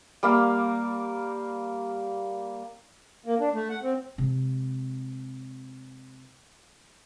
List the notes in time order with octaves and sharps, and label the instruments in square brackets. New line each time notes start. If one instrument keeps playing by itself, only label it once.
[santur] G3 A#3 F5
[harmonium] A#3
D4
A3
F#5
C4
[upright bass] C3 G#3